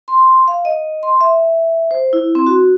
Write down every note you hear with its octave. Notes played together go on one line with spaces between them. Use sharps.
C6
F5
D#5
C6
E5
C5
E4
C4
F#4